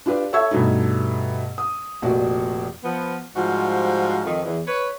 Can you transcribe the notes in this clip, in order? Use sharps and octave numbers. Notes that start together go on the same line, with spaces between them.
D4 F4 G4 B4 D5
A4 C#5 E5 C#6 E6 G#6
G2 B2 A3 D#4
D#6
F1 A#2 F3 F#4 D5
F3 B3
G#2 F3 G3 F4 F#4
F2 D#3
E2
B4 C#5